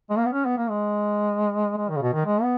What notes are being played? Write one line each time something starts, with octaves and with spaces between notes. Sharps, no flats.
G#3
A#3
B3
C#4
B3
A#3
G#3
G#3
D#3
C#3
B2
D#3
G#3
B3